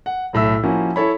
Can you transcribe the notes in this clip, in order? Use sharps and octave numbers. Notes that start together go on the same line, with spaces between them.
F#5
B1 A2 E5 E6
F3 A#3 C#4 E4 F#4
E4 A4 C#5 B5